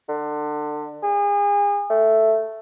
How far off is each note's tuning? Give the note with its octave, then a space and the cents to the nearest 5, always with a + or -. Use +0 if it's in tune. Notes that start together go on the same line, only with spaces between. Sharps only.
D3 +25
G#4 -35
A3 +5